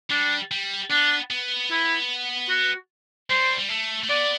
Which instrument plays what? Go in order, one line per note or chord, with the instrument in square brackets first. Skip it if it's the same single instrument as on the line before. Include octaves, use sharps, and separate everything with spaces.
[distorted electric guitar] G3 [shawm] D4
[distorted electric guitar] G3
[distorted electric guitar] B3 [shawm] D4
[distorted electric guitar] B3
[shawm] E4
F#4
[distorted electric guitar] G3 [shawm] C5
[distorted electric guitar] G3
A3
A3
[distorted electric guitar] B3 [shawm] D5